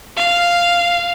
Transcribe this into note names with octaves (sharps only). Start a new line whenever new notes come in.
F5